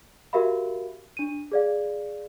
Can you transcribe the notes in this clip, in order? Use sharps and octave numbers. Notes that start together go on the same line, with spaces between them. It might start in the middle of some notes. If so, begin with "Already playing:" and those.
F#4 G4 A#4 E5 F5 B5
D4 D#7
G#4 D5 F5